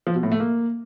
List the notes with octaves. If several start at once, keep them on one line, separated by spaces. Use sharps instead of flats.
F3
B2
A2
A3
A#3